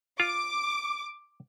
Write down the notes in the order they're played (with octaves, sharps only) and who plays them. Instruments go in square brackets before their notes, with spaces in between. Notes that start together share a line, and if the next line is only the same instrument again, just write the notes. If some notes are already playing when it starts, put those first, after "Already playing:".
[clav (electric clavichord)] F4 [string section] D6